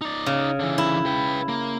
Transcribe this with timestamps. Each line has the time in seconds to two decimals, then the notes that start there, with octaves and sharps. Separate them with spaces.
0.01 D#4 D5
0.26 C#3
0.60 D3 E3
0.78 E4
1.06 B4 G5
1.49 A#3